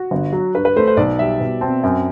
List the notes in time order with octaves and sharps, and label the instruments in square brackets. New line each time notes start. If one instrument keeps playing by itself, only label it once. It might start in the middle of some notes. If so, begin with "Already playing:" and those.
Already playing: [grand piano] F#4
[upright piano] G1
F#3
[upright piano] G2 [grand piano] B4
[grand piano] B4
[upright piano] A3 [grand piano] C5
[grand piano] C5
[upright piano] B1 [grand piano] D5
[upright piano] G3 [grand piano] E5
[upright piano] B2
[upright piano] C4 [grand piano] A5
[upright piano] F#2 [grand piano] G5